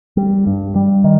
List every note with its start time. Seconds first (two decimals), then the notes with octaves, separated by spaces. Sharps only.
0.17 G3
0.47 G2
0.76 G3
1.04 D#3